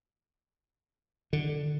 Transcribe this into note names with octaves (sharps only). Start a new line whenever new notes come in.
D3